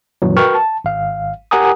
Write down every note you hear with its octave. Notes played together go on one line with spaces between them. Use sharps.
F#2 A#2 D#3 E3 F#3
F#4 A#4 B4 G5 C#6 F6
A5
G#1 F5
G4 A#4 F#5 G#5 A#5 D#6